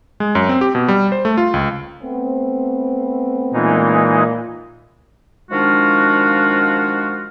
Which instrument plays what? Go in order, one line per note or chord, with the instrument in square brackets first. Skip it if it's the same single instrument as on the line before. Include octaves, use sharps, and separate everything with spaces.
[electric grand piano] G#3
F#2
C4
G4
B2
G3
C5
A3
F4
C#2
[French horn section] A3 B3 C4
[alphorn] A#2 [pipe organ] E3 G#3 D#4
[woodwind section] D#3 F3 G#3 D4 F4 F#4